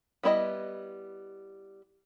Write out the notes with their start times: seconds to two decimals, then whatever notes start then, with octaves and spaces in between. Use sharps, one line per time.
0.23 G3 B3 E4 C#5 D#5